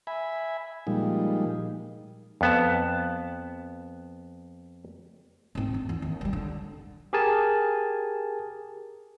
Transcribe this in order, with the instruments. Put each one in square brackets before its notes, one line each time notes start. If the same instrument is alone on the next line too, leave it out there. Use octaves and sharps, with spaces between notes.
[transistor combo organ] E5 G#5 B5
A#2 F3 G3 G#3 D#4
[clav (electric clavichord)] F2 B3 A5
[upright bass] G#2 C4
G1
E2
D#2
E3 G3
D3
[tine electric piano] G4 G#4 A#4 G#5 A5